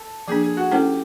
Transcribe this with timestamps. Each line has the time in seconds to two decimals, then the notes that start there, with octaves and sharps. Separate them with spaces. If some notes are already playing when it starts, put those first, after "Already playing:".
Already playing: A4
0.28 F3 A#3 D4 G#4
0.43 G#4
0.57 F#4
0.72 A3 C#4 E4 G4 A4 C5